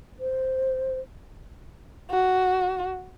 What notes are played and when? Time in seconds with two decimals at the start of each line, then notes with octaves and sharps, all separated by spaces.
0.20 C5
2.11 F#4